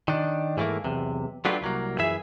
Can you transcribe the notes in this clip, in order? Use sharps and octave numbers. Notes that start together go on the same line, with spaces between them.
D#3 D4
G#2 E3 G3 A3 A#3
B1 E2 C3
F#3 A3 D4 F4 G4 B4
C2 F#3 A#3
F#2 E3 G#4 E5